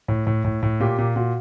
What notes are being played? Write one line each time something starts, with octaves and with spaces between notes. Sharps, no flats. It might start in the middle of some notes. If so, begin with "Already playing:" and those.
A2
A2
A2
A2
A#2 G4
A#2
A#2 F#4